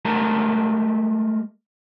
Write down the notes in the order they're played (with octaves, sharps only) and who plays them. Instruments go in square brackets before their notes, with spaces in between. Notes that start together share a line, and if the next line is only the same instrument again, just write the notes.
[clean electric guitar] G#3 A3 G4 A#4 A5 A#5